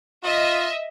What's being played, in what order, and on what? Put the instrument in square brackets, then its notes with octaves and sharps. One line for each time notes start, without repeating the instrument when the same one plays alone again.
[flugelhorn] F4 [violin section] D#5 E5